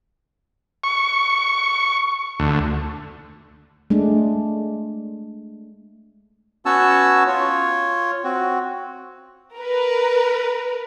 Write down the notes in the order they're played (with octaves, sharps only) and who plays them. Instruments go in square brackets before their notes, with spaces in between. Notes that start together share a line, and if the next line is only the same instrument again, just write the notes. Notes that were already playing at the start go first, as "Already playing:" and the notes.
[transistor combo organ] C#6
D2
[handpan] G#3 A3 D4
[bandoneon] B3 C#4 F#4 C#5 A5 E6
F4 C#5
C4 F#4
[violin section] A#4 B4